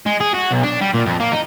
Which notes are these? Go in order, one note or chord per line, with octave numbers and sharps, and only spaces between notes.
G#3
G#4
F#4
B1
D4
G3
A#2
F2
A#3
D#4